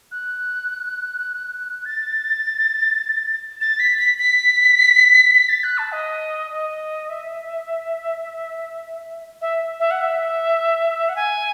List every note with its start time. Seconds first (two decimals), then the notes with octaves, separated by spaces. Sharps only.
0.12 F#6
1.85 A6
3.61 A6
3.80 B6
3.98 B6
4.18 B6
5.35 B6
5.49 A6
5.64 F#6
5.78 A5
5.92 D#5
6.51 D#5
7.09 E5
9.41 E5
9.80 E5
9.91 F#5
10.01 E5
11.09 F#5
11.16 G#5